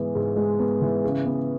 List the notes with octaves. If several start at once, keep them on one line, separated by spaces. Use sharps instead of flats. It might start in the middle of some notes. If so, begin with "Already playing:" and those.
Already playing: G#2 E3 G#3 B3
G#2
G#3
B3
E3
C#3
B3